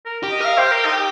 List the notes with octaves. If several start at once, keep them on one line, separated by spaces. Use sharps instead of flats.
A#4
G4
D#5
A#4 F5
G4 C5
A#4
D#4